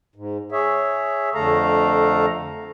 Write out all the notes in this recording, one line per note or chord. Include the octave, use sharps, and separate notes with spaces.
G#2
G#4 C#5 E5
F2 D3 A3 A4 F5 A#5